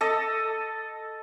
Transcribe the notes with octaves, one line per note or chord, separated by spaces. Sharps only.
A4 D#5